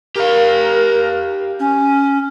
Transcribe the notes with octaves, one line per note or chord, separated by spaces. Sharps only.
G4 A#4 F5
C#4